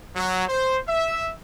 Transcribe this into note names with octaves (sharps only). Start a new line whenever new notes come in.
F#3
C5
E5